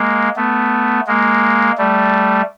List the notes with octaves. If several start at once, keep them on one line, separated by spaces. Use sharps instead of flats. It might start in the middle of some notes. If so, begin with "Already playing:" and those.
Already playing: G#3 A#3
A3 B3
G#3 A#3
G3 A3